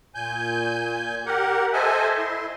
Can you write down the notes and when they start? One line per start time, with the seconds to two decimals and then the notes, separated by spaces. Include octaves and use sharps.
0.15 A#2 G#5 G6
1.26 G4 A#4 F#5
1.73 A4 C5 D#5 E5 G#5
2.18 E4 C6